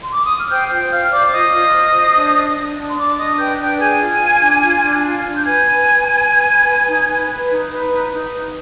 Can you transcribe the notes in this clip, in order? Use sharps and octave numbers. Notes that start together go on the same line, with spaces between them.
C6
D6
D#6
F6
C5 G5 G6
F4 G5 G6
C5 F5 F6
C5 D5 D6
F4 D#5 D#6
F4
C5
C5
D4
D4
D4
D4
C6
D4 D5 D6
D4 D#5 D#6
B4 G5 G6
D4 G5 G6
G#4 G#5 G#6
F4
F4
D4
F4
D4
F4
D4
G6
B4 G#5 G#6
B4
B4
B4
B4
B4
B4
D#4
B4
B4
D#4
B4
D#4
D#4
B4